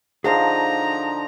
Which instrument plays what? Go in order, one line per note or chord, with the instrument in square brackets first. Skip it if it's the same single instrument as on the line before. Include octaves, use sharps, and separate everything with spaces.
[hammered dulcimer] D3 F3 D#4 [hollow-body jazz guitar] G#4 F5 [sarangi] A#5